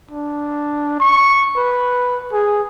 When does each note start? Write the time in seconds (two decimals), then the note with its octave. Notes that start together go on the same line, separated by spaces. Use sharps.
0.12 D4
1.00 C#6
1.57 B4
2.33 G#4